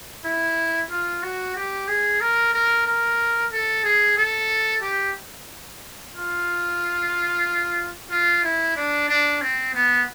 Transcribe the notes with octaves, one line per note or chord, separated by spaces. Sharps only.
E4
F4
F#4
G4
G#4
A#4
A#4
A#4
A4
G#4
A4
G4
F4
F4
E4
D4
D4
C4
B3